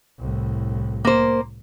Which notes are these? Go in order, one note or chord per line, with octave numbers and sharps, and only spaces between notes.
C2 A2
A#3 C5